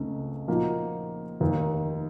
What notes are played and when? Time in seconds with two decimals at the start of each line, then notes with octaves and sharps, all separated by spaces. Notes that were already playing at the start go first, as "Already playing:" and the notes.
Already playing: C#2 C#3 A3 C4 D#4
0.48 A#2 F3 A#3 D#4 F#4
1.41 F1 D#2 D#3 A#3 D#4